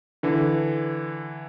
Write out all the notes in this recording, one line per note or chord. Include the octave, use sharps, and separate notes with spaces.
D3 E3